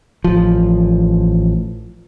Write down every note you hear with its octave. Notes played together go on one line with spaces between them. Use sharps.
A1 F3